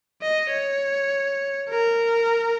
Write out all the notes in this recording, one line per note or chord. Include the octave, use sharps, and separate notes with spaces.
D#5
C#5
A#4